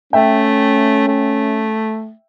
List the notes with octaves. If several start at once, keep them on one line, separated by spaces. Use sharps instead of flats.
A3 C#4 E5 G5
A3